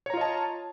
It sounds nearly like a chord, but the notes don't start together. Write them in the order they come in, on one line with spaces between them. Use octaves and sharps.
C#5 A#5 F4 D#5 A5